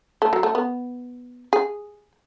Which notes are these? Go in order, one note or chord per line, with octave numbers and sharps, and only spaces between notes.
A3
F#3
A3
B3
G#4